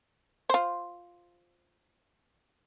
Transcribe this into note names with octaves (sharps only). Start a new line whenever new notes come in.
F4 C5